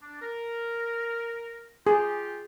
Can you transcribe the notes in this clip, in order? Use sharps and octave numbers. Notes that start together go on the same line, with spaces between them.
D4
A#4
F4 G4 G#4